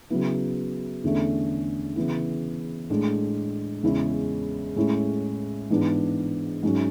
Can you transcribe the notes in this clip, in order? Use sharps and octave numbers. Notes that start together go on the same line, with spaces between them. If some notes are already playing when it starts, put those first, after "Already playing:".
C#3 F#3 B3 E4
E2 D3 A3 C#4
C#3 E3 B3 E4
A2 G#3 D4
E2 C#3 G#3 C#4 E4
A2 G#3 C#4 E4
G#2 E3 B3 D4
G#2 F#3 C#4